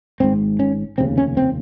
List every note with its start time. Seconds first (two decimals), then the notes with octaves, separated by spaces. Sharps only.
0.20 G#1 G#2 C4
0.59 C#4
0.98 F1 D#2 C#3 C4
1.18 C#4
1.37 C4